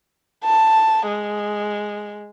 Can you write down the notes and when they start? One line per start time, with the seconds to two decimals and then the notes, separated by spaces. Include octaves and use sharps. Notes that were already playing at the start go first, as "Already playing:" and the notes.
0.44 A5
1.07 G#3